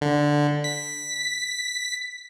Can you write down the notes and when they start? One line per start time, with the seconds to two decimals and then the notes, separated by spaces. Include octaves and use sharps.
0.01 D3
0.64 B6